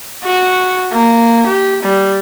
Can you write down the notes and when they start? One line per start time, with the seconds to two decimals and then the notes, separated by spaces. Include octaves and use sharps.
0.24 F#4
0.92 A#3
1.47 G4
1.83 G3